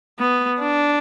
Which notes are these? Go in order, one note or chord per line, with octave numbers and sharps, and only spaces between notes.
B3
D4